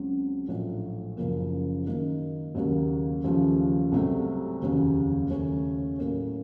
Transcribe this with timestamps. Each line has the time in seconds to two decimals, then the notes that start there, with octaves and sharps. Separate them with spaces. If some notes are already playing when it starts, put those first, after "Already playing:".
Already playing: C#2 C#3 F#3 C4 F#4
0.48 A#1 A2 F#3 A3
1.17 F#1 F#2 C#3 F3 A#3
1.86 F#2 D#3 A#3
2.55 D#2 C#3 F#3 A#3
3.24 D#2 C#3 F3 A3
3.92 C2 C3 F#3 A3
4.61 F1 D#2 C#3 F#3
5.30 D#2 C#3 A3 C#4
5.99 A2 F#3 A#3 C#4